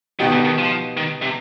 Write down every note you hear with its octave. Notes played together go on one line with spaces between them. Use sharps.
B2 D#3 B3 D#4 G4
D3
D#3
F3
D#3
C3